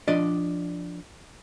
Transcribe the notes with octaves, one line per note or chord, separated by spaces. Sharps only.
F3 D4 D5 D#5